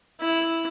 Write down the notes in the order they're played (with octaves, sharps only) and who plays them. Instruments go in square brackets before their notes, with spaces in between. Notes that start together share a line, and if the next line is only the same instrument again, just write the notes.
[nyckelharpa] E4